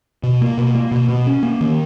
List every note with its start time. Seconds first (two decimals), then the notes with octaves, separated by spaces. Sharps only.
0.23 B2
0.41 A#3
0.58 B2
0.75 A#3
0.92 B2
1.09 B2
1.27 C#4
1.43 A#3
1.61 D#3